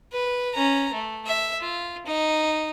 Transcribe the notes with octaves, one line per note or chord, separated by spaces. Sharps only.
B4
C#4 A#5
A3
E5
F4
D#4